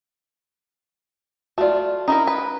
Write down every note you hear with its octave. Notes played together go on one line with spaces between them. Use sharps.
A3 F4 F#4 D5
C#4 D#4 E4 A#4
B4